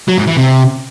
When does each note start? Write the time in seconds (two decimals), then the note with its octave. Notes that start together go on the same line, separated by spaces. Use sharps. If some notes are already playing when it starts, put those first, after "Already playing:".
0.08 F#3
0.18 G#2
0.27 E3
0.37 C3